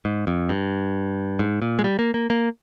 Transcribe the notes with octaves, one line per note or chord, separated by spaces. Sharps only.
G#2
F2
G2
G#2
A#2
G#3
G3
A#3
A#3
A#3